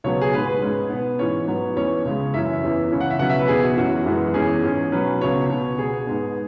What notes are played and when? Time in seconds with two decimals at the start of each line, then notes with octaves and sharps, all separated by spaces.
0.04 C#2 B2 F#3 B3 C#5
0.21 G#4
0.33 G#2 G#3 B3 B4
0.48 B4
0.62 G#2 G#3 C#4
0.90 B2 B3
1.19 G#2 E3 C#4 C#5
1.47 G#2 F#3 B3
1.76 E2 E3 C#4 C#5
2.05 C#2 C#3 G#3
2.34 F#2 E3 C#4 E5
2.62 E2 E3 C#4
2.92 C#2 C#3 E3 C#4
3.00 F#5
3.10 E5
3.19 C#2 B2 F#3 C#4 F#5
3.30 E5
3.39 B4
3.49 E2 B2 B3 G#4
3.63 F#4
3.77 F#2 E3 C#4 F#4
4.06 F#2 E3 G#3 B3
4.34 E2 E3 C#4 G#4
4.63 G#2 E3 C#4
4.92 B2 F#3 C#4 B4
5.21 C#2 B2 F#3 C#4 C#5
5.50 B2 B3
5.78 B2 B3 G#4
6.07 G#2 G#3 B3